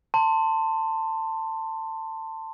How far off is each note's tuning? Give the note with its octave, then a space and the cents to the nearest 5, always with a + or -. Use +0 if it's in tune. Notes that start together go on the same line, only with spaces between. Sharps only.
A5 +20 C6 +0